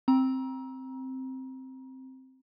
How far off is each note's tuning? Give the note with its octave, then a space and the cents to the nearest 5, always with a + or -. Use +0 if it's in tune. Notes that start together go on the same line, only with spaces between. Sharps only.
C4 +0 A#5 +25